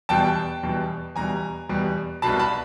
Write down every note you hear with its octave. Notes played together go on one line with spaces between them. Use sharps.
E2 B2 G3 G5 A5
E2 B2 G3
E2 B2 G3 G#5 A#5
E2 B2 G3
C2 B2 F#3 A5 B5
A5 B5